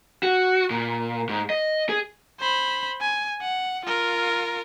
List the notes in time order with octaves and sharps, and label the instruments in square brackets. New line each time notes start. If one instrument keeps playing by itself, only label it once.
[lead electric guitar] F#4
A#2
G#2
D#5
G#4
[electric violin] C5 B5
G#5
F#5
F4 A#4